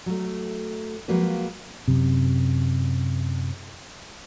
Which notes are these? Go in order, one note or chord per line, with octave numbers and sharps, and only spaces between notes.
F#3 A3
F3 F#3 G#3 A#3 F#4 B4
F#2 C3